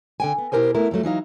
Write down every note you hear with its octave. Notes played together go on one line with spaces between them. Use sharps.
D3 G5 G#5
B3
B2 E4 G4 A#4 C5 G#5
A3 B3 E4 A#4
F2 G#2 F#3 A3
E3 F#3 D#4 F5